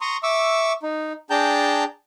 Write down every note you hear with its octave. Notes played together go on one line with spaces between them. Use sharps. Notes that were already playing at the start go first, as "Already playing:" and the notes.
A#5 C6 C#6 D#6
E5 C#6 D6 E6
D#4
D4 G#4 G5 A5 A#5 G6